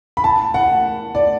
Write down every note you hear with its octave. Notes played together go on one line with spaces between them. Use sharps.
B5
A5
F#5
D5